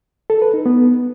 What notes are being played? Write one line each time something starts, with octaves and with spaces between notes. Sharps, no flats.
A4
B4
D#4
B3